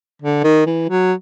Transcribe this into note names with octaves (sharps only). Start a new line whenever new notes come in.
D3
D#3
E3
F#3